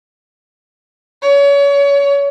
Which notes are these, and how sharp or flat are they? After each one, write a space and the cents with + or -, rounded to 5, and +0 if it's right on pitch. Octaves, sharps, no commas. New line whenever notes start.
C#5 +30